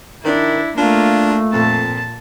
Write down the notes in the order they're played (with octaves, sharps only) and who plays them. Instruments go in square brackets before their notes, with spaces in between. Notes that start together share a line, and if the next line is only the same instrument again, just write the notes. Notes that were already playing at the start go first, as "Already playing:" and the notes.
[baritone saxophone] D#3 [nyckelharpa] D4 [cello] E4
[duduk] A3 [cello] A#3 [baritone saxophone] D4 [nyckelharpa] F4
[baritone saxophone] F2 [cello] A#2 [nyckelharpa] A5